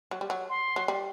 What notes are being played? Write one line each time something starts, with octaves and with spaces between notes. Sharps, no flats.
F#3
G3
F#3
C6
F#3
G3